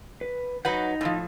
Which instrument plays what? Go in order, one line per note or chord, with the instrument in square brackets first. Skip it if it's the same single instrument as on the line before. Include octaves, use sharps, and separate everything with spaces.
[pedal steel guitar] B4
[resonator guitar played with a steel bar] F#3 B4 F#5 [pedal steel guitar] D#4 G6
[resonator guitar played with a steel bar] A2 D#3 F3